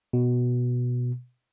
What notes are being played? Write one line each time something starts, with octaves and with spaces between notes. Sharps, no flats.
B2